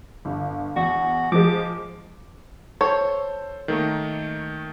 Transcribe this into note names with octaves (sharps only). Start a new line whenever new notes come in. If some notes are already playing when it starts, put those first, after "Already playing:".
G1
E2 F#4
F3 G#3 D6
A4 C5 C#5
D#3 A3 A#3